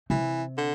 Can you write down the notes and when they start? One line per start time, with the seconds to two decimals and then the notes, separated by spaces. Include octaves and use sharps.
0.10 C3 E3
0.57 D3